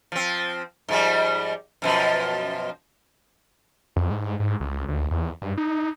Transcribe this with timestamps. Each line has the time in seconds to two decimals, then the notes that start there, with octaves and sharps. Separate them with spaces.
0.12 F3 C4
0.89 G#2 F3 G3
1.82 F#2 B2 F3
3.96 F2
4.11 G#2
4.40 G#2
4.60 C#2
4.88 D2
5.11 E2
5.42 G2
5.57 D#4